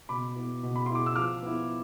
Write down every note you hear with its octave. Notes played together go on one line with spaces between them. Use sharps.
B2 B5 D6
B3 E4
B2
B5
B3 E4 C6
D6
E6
F3 D6 F6
B3 E4